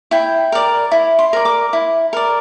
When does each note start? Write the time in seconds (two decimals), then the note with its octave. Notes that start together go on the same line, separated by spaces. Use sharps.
0.11 E4 G5
0.52 A#4 D5
0.91 E4
1.19 C6
1.33 A#4 D5
1.45 D6
1.73 E4
2.13 A#4 D5